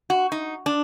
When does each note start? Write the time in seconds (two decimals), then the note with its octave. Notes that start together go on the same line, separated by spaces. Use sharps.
0.10 F#4
0.32 D#4
0.66 D4